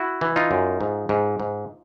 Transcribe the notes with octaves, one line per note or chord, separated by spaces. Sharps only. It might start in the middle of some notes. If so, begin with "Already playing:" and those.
Already playing: E4 F#4
E3
D#4 F4
F#2
G#2
G#2
G#2